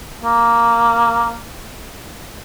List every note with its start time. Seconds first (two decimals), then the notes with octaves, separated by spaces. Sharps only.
0.22 A#3